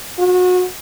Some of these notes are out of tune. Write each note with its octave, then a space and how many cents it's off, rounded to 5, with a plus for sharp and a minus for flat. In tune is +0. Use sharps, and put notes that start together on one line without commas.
F#4 -30